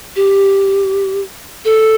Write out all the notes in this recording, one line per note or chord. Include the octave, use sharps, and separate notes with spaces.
G4
A4